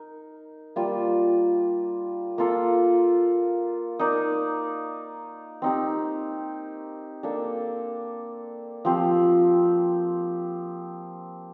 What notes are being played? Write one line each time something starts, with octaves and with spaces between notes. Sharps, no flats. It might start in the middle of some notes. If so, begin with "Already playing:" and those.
Already playing: D#4 A#4
G3 A#3 F4
A#3 F4 A4
D#4 A#4 D5
C4 D#4 G4
A#3 D4 A4
F3 C4 G4